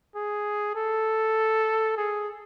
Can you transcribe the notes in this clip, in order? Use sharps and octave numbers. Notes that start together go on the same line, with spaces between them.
G#4
A4
G#4